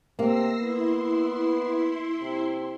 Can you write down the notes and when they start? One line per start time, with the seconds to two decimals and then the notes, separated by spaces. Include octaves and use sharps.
0.19 C3 A#3 E6 A#6 C7
0.59 B3 E4 C6
2.22 C3